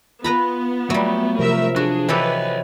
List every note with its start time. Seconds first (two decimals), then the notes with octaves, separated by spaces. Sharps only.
0.24 B3 F4 B4 A#5 B5
0.90 F#3 G3 A3
1.39 C3 F3 A#4 E5
1.76 D4 F#4 G#4
2.09 E3 G4 A4 B4 C#5 D#5